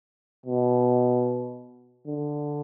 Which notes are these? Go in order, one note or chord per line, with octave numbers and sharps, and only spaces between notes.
B2
D3